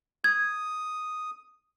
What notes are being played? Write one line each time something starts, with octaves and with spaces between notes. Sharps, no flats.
D#6 G#6